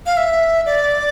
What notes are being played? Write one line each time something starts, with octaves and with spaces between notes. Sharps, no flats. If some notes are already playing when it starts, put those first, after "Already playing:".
F5
E5
D5